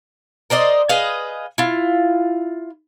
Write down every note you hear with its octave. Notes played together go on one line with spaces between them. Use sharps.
A#4 C5 D5 D#5
G#4 B4 D#5 F5
E4 F4